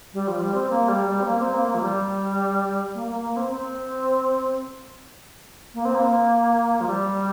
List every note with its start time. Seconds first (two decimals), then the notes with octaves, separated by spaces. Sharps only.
0.14 G3
0.28 F3
0.41 G3
0.55 C4
0.70 A#3
0.89 G3
1.06 G3
1.21 C4
1.25 A#3
1.40 C4
1.54 A#3
1.68 A#3
1.75 F3
1.81 G3
2.94 A#3
3.08 A#3
3.21 A#3
3.37 C4
3.50 C4
5.74 A#3
5.85 C4
5.95 A#3
6.81 F3
6.88 G3